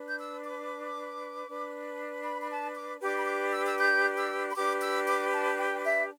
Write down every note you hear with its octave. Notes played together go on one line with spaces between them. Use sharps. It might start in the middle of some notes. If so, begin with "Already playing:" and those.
Already playing: D4 B4
G6
E6
D6
D4 B4
B5
B5
A5
D6
D4 G4 B4 D6
B5
D6
E6
E6
G6
E6
B5
D4 G4 B4 D6
E6
D6
A5
G5
E5